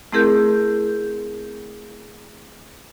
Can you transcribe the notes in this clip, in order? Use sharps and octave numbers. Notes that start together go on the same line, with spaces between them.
A3 C4 E4 G#4 A#4 G6